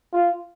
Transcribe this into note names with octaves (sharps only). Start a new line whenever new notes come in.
F4